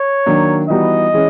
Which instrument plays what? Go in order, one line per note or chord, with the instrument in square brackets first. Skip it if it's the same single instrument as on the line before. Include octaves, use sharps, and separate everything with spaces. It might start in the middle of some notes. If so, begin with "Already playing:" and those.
Already playing: [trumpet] C#5
[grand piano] D#3 F#3 A#3 D4
[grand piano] E3 G3 B3 D#4 F#4 [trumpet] D#5
[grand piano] E3 G#3 C#4